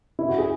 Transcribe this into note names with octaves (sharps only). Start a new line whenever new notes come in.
E4
F#4
G#4